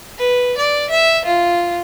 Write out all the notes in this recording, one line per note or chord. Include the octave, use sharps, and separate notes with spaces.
B4
D5
E5
F4